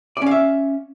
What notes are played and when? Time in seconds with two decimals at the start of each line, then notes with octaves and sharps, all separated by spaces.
0.17 D5
0.22 C#4
0.26 F5
0.31 E5